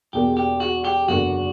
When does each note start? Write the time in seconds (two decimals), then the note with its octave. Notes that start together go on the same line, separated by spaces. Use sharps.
0.13 E1 E2 B2 A#3 G4
0.37 G4
0.60 F#4
0.85 G4
1.08 F#1 E2 D3 A#3 F#4